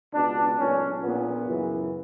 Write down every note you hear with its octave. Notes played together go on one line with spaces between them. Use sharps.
C#2 B2 D4
B1 A#2 C#4
A#1 A#2 B3
F#2 C#3 E3